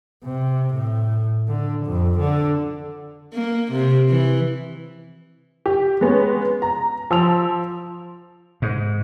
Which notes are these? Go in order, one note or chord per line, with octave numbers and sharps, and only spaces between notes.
C3
A2
D3
F2
D3
A#3
C3
E3
G4
G#3 B3 C#4
A#5
F3 E6 F7
G#2